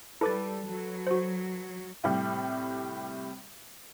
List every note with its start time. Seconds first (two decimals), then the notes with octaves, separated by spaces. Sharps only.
0.21 G3 E4 A4 B4 D6 A6
0.68 F#3
1.07 F#4 C5
2.04 A2 C3 G3